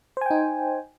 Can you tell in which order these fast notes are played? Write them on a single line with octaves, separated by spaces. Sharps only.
C5 G#5 G5 D#4